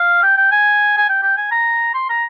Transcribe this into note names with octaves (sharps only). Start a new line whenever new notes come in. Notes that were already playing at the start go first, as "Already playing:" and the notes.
Already playing: F5
G5
G5
G#5
G#5
G5
G5
G#5
A#5
C6
A#5